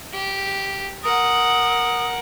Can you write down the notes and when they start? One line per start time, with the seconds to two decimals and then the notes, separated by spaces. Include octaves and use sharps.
0.13 G4
1.04 A#4 F#5 D#6